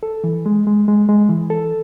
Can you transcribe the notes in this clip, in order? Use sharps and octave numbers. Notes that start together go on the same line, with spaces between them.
A4
E3
G#3
G#3
G#3
G#3
E3
A4